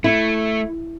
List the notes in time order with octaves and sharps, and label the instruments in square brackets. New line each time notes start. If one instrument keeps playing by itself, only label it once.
[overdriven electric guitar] A3 [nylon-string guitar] E4